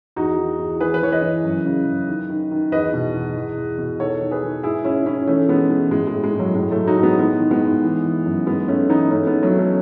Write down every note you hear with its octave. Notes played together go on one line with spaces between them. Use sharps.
E2 D#4 F#4
D#3
E2
E3 G#4 B4
B4
E3 C#5
B4 D#5
E3
F#2
C#3
F#2
D#3
D#3
D#3
E2 B4 D#5
B2
E2
E2
E2
B2
D#3 A4 C#5
D#3
G#4 B4
D#3
G#2 E4 G#4
G#2 C#4 E4
D#3 C#4 E4
E3 A3 C#4
E3 G#3 B3
E3 G#3
A2 G#3
G#3
A2
G#3
A2
F#3
A2 G#3
F#3 A3
A2
D#4 F#4
A2
G#3 B3
D#3 G#3 B3
D#3
G#3 B3
G#2
E3
E3
F#2
G#2 G#3 B3
G#2 A3 C#4
E3 B3 D#4
G#2 A3 C#4
G#3 B3
D#3
F#3 A3
D#3
A3 C#4